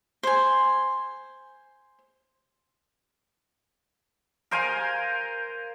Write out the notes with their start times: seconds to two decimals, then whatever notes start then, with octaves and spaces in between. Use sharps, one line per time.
0.23 C5 G#5
4.51 A#4 C5 F5 G#5